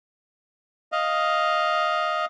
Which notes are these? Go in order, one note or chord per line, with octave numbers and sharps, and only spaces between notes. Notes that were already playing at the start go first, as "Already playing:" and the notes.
D#5 F5